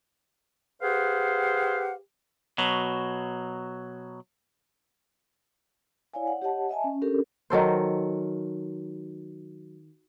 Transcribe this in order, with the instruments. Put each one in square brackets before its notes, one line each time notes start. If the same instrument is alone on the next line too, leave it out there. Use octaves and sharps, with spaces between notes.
[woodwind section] G4 G#4 B4 C5 F5 F#5
[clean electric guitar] B2 F#3
[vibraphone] E4 C#5 D5 F5 G#5
F#5
G4 C#5 D#5 F#5 A5
D#5 E5 G#5 A5
C#4
C#4 D4 G4 A4 A#4
[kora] D#3 F#3 A4 C5